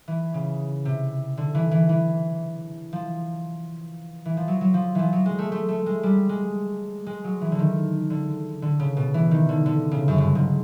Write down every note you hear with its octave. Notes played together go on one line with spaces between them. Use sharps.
E3
C#3
C3
D3
E3
E3
E3
F3
E3
F3
F#3
F#3
F3
E3 F3
F#3
G#3
A3
A3
A3
G#3
G3
G#3
G#3
F#3
E3
D3
D#3
D3
D3
C#3
B2
E3
D#3
D3
D3
C#3
F#2
G2
G#2